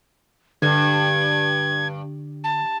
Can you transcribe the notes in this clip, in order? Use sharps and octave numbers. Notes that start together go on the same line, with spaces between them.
G2 D3 G#6
A5